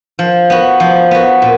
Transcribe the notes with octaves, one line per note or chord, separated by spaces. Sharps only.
F3
B3 F#4
F3
B3 F#4
A#2